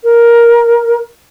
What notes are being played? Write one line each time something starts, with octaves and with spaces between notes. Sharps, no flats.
A#4